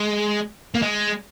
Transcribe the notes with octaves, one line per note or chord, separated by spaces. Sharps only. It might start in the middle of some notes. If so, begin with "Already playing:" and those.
Already playing: G#3
A#3
G#3